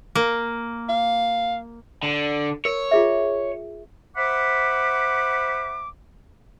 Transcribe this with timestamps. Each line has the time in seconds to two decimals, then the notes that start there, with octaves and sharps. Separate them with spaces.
0.15 A#3
0.89 F5
2.03 D3
2.65 A#4 C#5
2.91 F4 G#4 E5
4.17 C5 E5 F#5 B5 D6